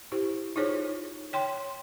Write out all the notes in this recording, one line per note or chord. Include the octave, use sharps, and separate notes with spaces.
E4 G4 C5
D#4 F4 G#4 C5 C#5
C#5 G5 C6